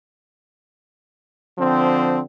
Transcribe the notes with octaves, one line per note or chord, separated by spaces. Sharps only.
D3 F3 C4